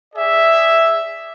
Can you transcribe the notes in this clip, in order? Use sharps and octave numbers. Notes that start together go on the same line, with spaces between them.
G#4 D5 E5